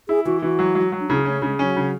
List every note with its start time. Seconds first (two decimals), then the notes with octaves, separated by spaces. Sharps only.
0.08 E4 G#4
0.25 E3 F#4
0.42 E3 F#4
0.59 F#3
0.75 F#3
0.92 F#3
1.00 D4
1.10 C#3 E4
1.25 A3 C#4
1.42 C#3 G#3
1.59 F#3 C#4
1.76 C#3